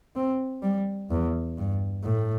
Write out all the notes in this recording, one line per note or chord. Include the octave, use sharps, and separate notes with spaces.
C4
G3
E2
G2
A2